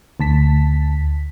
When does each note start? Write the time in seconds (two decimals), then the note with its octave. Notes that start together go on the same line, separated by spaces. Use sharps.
0.20 D2 A5 B6